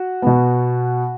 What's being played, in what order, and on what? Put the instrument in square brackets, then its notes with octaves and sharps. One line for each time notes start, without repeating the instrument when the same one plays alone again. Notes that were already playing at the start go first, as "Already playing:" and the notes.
Already playing: [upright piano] F#4
B2 B3